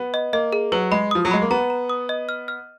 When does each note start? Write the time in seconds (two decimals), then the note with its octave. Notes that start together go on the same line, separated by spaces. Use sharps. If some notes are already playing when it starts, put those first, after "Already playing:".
Already playing: B3
0.14 D#5
0.33 A#3 D#5
0.53 G#4
0.72 F#3 B4
0.92 G#3 B5
1.11 F3 D#6
1.25 F#3
1.31 G#3 B5
1.42 A#3
1.51 B3 A#5
1.70 A#5
1.89 D#6
2.09 D#5
2.29 F6
2.48 F6